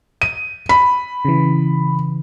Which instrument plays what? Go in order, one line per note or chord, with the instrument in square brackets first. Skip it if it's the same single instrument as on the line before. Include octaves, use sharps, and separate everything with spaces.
[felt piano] D#7
B5
[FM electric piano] C#3 E3